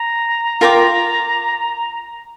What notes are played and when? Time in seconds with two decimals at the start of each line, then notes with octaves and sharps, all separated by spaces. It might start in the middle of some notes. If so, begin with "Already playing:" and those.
Already playing: A#5
0.61 F4 A#4 G5 D6